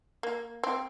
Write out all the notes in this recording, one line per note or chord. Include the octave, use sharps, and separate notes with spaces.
A#3
C4